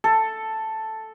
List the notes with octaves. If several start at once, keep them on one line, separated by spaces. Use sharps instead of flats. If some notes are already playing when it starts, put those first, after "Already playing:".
A4